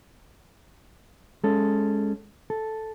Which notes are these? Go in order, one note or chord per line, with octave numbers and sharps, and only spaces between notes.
G#3 C#4 A4
A4